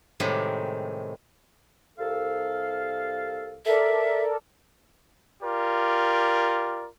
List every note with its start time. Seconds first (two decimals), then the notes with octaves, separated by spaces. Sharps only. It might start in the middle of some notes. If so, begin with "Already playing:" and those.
0.20 A2 C3 D#3 G3 G#3
1.98 C2 A4 F5
3.66 A4 A#4 D5 E5
5.43 F4 G4 A#4 D5